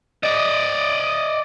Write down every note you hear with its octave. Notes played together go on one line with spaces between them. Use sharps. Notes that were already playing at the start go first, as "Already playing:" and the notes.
D5 D#5